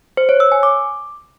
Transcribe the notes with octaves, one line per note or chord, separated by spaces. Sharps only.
C5
C#5
E6
G#5
D6